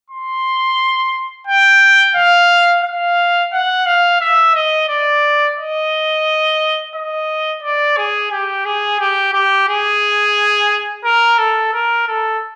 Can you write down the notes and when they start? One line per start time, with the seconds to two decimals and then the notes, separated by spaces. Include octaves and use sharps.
0.10 C6
1.47 G5
2.15 F5
2.83 F5
3.53 F#5
3.86 F5
4.21 E5
4.54 D#5
4.89 D5
5.58 D#5
6.95 D#5
7.63 D5
7.97 G#4
8.31 G4
8.65 G#4
9.00 G4
9.33 G4
9.68 G#4
11.05 A#4
11.38 A4
11.73 A#4
12.07 A4